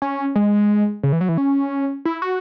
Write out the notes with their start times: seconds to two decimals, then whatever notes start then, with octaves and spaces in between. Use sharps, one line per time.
0.02 C#4
0.36 G#3
1.03 C#3
1.12 E3
1.21 F#3
1.29 E3
1.37 C#4
2.05 E4
2.22 F#4